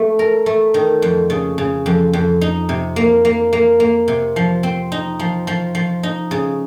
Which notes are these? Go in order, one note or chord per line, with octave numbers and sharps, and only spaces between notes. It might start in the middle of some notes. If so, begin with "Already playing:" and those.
Already playing: A3
A#4
A3
D#3
F2
C#3
C#3
F2
F2
D#4
C3
A#3
A#3
A#3
A#3
C3
F3
C4
D#4
F3
F3
F3
D#4
C#3